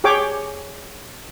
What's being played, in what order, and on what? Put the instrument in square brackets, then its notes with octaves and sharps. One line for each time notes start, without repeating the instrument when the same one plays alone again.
[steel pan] G4 G#4 C#5 G5 D6